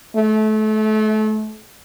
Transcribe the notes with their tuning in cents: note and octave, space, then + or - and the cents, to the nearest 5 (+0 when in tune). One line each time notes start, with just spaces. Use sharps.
A3 -30